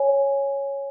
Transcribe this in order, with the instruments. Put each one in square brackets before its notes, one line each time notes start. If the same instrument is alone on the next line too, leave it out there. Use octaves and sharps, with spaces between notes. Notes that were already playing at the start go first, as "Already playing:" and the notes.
Already playing: [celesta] C#5 G#5